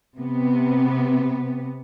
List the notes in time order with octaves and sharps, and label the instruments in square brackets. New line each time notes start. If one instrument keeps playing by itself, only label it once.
[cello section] C3 B3